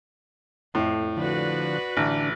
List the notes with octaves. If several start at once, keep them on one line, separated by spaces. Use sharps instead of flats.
F2 A2
D3 F3 F#4 B4 D5
A1 D3 D4